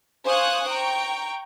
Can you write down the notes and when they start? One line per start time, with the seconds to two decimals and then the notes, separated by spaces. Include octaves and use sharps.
0.25 C5 F5 G#5 C#6 D#6 F#6
0.68 G5 A#5 C#6